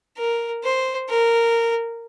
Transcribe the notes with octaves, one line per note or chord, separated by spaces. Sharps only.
A#4
C5
A#4